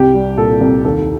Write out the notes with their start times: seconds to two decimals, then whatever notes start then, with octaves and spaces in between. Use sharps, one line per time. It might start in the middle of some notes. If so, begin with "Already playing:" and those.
Already playing: C2 G4
0.14 G3
0.37 A#2 A4
0.61 C2
0.85 D#2 A4